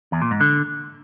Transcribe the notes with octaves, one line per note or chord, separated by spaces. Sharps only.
E2
A#2
G#2
D3